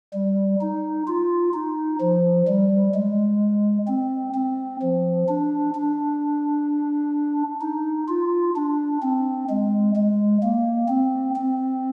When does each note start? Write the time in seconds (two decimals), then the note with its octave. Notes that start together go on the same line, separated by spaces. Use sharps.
0.14 G3
0.61 D#4
1.08 F4
1.54 D#4
2.01 F3
2.48 G3
2.94 G#3
3.88 C4
4.35 C4
4.82 F3
5.28 D4
5.75 D4
7.62 D#4
8.09 F4
8.56 D4
9.03 C4
9.49 G#3
9.96 G#3
10.43 A#3
10.89 C4
11.36 C4